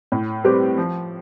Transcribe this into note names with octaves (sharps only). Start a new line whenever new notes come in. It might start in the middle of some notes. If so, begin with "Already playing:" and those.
A2
G3 C4 G4 B4
F3